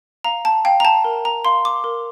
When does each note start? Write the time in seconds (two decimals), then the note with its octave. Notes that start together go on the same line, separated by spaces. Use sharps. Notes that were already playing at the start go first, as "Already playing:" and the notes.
0.24 F5 A#5
0.45 A5
0.65 F5 G5
0.80 A#5
0.85 A5
1.05 A#4
1.25 A#5
1.45 F5 C6
1.65 D6
1.84 A#4